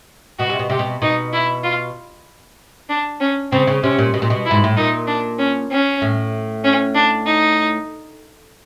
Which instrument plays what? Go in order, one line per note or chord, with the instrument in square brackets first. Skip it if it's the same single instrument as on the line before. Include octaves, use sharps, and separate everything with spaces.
[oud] B2 [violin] F#4
[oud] C3
B2
[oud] C3 [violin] G4
[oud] B2
[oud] B2 [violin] D#4
[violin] E4
F4
D4
C#4
[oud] C#3 [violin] C4
[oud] C#3
[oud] C3 [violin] C#4
[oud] A#2
B2
A#2
B2
[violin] E4
[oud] G#2
A2
[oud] A#2 [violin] D#4
[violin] D4
C#4
C#4
[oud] A2
[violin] C#4
D4
D#4